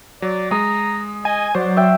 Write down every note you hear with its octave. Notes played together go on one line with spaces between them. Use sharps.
F#3 D5
G#3 A#5 D#6
D#5 G#5
F#3 C5 D5
E5 G5